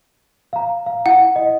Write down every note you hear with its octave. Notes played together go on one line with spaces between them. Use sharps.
F5 A#5
F5
E4 F#5
D#5